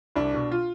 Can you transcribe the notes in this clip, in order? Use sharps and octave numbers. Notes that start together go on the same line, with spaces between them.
C2 D4
B2
F4